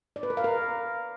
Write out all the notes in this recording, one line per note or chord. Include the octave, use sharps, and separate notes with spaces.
D5
B4
A#4
F5
A#4